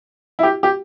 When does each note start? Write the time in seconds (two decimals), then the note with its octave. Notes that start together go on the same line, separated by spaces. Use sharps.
0.39 E4
0.43 G4
0.63 G4